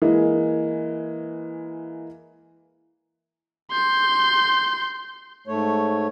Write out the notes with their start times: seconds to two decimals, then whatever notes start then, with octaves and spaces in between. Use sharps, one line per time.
0.02 E3 G#3 A#3
3.72 C6 G6
5.47 G#2 A3 C#5